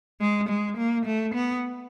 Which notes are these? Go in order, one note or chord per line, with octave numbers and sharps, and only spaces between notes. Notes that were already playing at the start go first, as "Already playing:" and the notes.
G#3
G#3
A#3
A3
B3